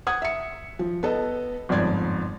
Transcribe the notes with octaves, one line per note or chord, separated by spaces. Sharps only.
F#5 D#6 G#6
E5 C#7
F3
B3 A4 D#5
G1 F2 G#2 D5 G#6